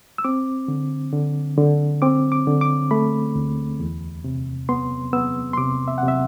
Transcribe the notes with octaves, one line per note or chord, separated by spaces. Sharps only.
E6
C4 D6
D3
D3
D3
C4 D6
D6
D3
D6
A3 B5
D2
E2
C3
B3 C6
B3 E6
C6
C3 D6
E5
F#5
C3
E5